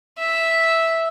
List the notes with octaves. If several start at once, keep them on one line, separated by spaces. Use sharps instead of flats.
E5